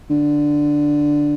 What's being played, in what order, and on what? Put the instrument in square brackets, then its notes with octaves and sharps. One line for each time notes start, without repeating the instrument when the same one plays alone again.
[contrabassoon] D3